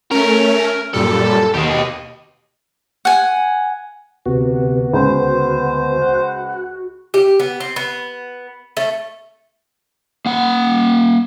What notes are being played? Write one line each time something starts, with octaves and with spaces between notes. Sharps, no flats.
A3 C#4 A#4
F#2 A#2 G3 A4
D#2 B2 G4 D#5
F#5 G#5
D2 C3 B3 F#4
C#2 C5
F#5
G4
B3
C4
B3
A3
A#3 F#5